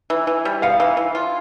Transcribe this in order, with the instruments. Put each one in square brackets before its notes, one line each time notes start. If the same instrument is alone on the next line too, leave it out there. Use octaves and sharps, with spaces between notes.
[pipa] E3
E3
G3
[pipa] B3 [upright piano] F5
[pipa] E3
E3
F4